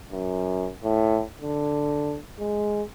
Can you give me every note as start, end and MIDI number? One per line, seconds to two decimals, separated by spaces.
0.12 0.68 42
0.84 1.22 45
1.41 2.18 50
2.39 2.83 56